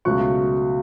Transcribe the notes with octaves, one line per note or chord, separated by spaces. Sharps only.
C#2 B2 F#3 A3 C#6 F#6